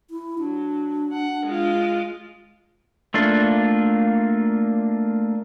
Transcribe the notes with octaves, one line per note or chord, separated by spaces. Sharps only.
E4
F#3 D4
F#5
G#3 F4
A3 A#3 D4 F4